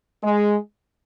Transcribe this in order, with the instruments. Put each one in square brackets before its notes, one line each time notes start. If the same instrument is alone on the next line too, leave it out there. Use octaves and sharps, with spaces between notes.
[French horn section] G#3